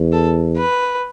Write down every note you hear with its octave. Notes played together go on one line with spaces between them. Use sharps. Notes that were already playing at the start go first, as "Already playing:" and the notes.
Already playing: E2
A4
B4